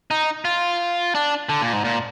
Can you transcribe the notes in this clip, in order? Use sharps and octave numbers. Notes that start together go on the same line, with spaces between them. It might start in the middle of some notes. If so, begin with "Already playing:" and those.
D#4
F4
D4
D3
A#2
G#2
A#2